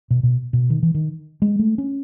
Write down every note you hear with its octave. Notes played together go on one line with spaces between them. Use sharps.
B2
B2
B2
D#3
E3
D#3
G#3
A3
C#4